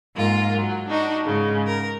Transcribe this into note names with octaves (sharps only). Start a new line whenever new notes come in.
G#2 A#3 F4
F#3
D4 D#4 F#4
G#2 C#3
A#4